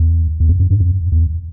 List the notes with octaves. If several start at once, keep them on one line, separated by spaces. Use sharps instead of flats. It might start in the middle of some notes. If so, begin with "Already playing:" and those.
Already playing: E2
E2
F2
F#2
G2
F2
E2